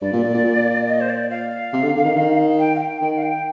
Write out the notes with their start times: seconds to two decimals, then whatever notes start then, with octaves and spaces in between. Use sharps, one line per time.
0.02 G2 D5
0.13 A#2
0.24 A#2
0.34 A#2
0.44 A#2
0.87 D#5
1.00 C5
1.09 D5
1.30 F5
1.73 C3
1.83 D3
1.96 D3
2.05 D#3
2.16 D#3
2.59 G5
2.76 F5
2.79 G5
3.01 D#3 G5
3.18 F5
3.23 G5